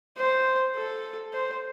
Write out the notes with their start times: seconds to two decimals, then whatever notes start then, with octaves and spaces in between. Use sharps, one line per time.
0.18 C5
0.75 A4
1.33 C5